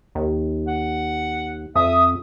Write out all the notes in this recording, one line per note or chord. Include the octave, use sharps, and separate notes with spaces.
D#2
F#5
F2 E5 D#6